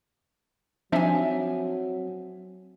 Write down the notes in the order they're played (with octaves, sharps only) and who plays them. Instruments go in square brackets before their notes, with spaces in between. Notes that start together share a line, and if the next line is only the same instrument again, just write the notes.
[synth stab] F3 D4 D#4 [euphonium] F#3 [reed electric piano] C4 [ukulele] E5 G#5